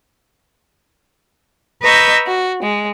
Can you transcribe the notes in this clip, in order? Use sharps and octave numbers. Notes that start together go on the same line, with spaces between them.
B4 D#5 A#5 C#6 E6 G6
F#4
G#3